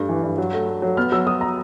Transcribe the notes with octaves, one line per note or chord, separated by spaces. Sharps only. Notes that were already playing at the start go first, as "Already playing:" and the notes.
Already playing: G2 A3
E3
G2
F#3
A3
A3
F#3
B3 F6
F#3 E6
F#3 D#6
A#5